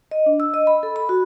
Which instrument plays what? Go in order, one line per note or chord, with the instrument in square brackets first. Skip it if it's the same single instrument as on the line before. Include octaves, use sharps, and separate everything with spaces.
[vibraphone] D#5
D4
E6
D#5
B5
A4
B5
F#4